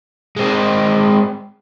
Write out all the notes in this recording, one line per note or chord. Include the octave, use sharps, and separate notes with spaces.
G#3 C4